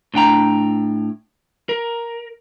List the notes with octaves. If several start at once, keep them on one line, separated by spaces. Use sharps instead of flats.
A2 D4 G5 A#5
A#4